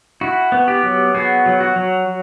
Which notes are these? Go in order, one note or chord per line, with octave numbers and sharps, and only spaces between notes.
E4 F#4
B3
G4
F#3
B3 F#4 G#4
F#3
F#4
F#3